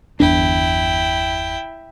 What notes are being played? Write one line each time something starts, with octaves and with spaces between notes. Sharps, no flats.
G1 E2 D4 E4 G5